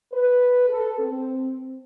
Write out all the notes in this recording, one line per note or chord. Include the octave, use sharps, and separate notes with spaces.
B4
A4
C4